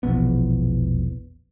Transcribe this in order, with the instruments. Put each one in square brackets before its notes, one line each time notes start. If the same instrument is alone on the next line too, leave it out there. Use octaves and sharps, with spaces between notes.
[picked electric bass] E1 A#1 E2 B3